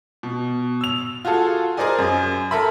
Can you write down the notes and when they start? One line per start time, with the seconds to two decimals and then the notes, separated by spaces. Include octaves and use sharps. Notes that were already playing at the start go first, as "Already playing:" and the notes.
0.23 B2
0.81 E6 F7
1.25 F4 F#4 G#4 A4
1.77 G#4 A#4 C5 D5 D#5 G#5
1.99 F#2
2.51 A4 A#4 E5 B5